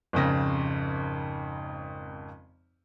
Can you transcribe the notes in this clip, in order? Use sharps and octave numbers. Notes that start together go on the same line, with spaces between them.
G#1 F2 C#3 A#6